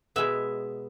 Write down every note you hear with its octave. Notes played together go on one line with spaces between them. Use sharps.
B2 G#3 B3 E5